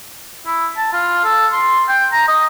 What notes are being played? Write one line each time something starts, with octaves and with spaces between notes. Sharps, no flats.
E4
A5
F4
A4
C6
G5
A#5
D#5